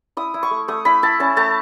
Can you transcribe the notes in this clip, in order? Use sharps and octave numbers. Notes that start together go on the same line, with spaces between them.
E4 D#6
E4
C#6
A3
A3 D#6
E4 B5
E4 A5
C#4 A5
A3 A5